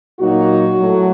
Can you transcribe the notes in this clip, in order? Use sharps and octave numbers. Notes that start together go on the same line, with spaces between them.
A#2 F#3 A#3 D#4 F#4
A2 F#3 A3